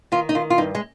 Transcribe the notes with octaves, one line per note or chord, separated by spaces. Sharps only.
D#3 F4
D#4
D#3 F4
F4
G2 D#4
G#3